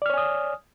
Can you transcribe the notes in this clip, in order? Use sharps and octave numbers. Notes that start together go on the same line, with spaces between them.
C#5 D5 G#5 D#6 F6